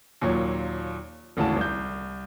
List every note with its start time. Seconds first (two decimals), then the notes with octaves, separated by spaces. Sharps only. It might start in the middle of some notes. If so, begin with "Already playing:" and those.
0.21 D#2 A#2 F#3 C#5
1.37 G#1 D2 C#3 E3 A5
1.57 C2 G6